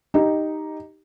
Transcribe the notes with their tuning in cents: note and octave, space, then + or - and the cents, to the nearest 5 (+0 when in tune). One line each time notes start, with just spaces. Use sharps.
D#4 +0 G4 +0